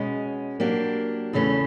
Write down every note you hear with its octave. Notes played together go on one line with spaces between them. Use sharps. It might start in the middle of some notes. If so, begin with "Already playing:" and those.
Already playing: B2 G#3 C#4
F#3 A#3 D4 G4
E2 C#3 E3 A3 C#4